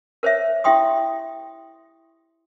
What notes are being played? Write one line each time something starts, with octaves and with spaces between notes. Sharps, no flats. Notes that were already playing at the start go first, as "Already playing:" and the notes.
A#4 C5 C#5 E5
E4 G4 E5 G5 C6 D#6